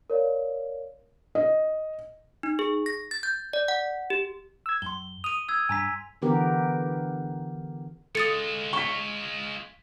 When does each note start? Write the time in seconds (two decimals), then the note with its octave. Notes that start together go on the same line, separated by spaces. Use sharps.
0.10 A#4 C#5 D5 F5
1.35 D#5
2.43 D#4
2.59 G#4
2.86 A#6
3.11 A6
3.23 G6
3.53 D5
3.68 F#5
4.10 G4
4.66 E6 G#6
4.82 F#2 C6 G7
5.24 D#6 D#7 F7
5.49 E6 G#6
5.69 G2 G#5 A#5 B6
6.22 D3 E3 B3 G4 A#4
8.15 G#3 F4 A4 D#6 A6 C#7
8.73 C#6 B6 G7